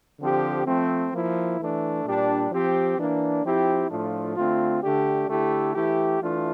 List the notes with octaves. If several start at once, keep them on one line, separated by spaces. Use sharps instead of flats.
D3 F3 C4 G4
F3 A3 C4
F3 A#3 E4
E3 A3 D4
A#2 G3 D4 G4
F3 C4 G4
E3 A#3 D4
F3 C4 E4 G4
A2 F3 A3 D4 F4
D3 A3 C4 F4
D3 A3 D4 G4
D3 A3 E4 G4
E3 A3 E4 G4
E3 A3 D4 F4